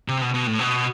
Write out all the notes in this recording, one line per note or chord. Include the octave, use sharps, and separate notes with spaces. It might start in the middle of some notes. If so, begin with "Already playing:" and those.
C3
B2
B2
A2
B2